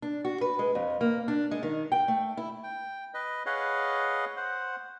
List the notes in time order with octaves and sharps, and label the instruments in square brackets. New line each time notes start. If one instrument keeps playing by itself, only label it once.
[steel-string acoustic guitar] D4
F#4
B4
G#3
F2
A#3
D4
G#3
D#3
G5
A3
E4
[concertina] G5
B4 D#5
G#4 B4 C#5 D#5 F5 F#5
C5 F#5